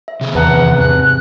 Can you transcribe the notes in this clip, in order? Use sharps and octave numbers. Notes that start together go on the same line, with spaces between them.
E5
C3 G#4
E2 B4 F#5 A5 A#5
G#2 C4 F#6
F#6